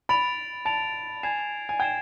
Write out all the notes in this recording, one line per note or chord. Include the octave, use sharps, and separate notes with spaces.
B5 A6 D7 F7
A5 A6 D7 F7
G#5 G#6 C7 E7
G#5
G5 G#6 C7 E7